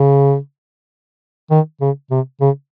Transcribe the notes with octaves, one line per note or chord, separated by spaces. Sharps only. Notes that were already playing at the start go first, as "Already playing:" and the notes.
Already playing: C#3
D#3
C#3
C3
C#3